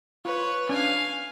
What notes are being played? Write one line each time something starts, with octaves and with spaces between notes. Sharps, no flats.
F4 B4 C#5
C#4 D4 F5 G#5